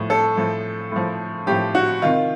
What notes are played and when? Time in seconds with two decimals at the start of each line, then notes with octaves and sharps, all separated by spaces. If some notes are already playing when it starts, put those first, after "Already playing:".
Already playing: A2 F3
0.10 A4
0.37 A2 F3
0.92 A2 F3
1.47 A2 F3 G4
1.75 F#4
2.02 C3 D#3 F4